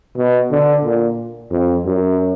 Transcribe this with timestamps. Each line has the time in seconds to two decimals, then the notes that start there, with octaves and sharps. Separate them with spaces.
0.17 B2
0.51 D3
0.85 A#2
1.52 F2
1.85 F#2